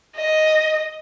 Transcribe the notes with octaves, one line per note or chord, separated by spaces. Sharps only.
D#5